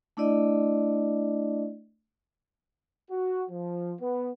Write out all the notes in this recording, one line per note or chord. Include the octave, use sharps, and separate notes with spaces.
A3 D4 E4 D5 D#5
F#4
F3
B3